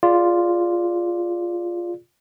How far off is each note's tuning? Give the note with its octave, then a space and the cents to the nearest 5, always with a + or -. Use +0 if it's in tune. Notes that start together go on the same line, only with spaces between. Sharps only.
F4 +0 G#4 +0 D5 +0